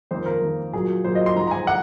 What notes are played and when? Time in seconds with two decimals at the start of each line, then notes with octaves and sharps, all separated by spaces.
0.11 F2 D#3 A#3 C5
0.26 A#4
0.42 F2 D#3 A#3
0.73 A#2 F#3 A#3 G#4
1.04 A#2 F#3 A#3 C5
1.15 D#5
1.26 C6
1.36 G#2 F3 G#3 A#5
1.47 A#5
1.51 G#5
1.67 F#5